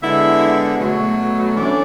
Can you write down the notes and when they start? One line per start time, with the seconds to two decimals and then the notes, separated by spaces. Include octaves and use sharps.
0.02 D3 G#3 B3 E4 E5
0.78 B2 F#3 A3
1.55 E3 A3 C#4 D4 D5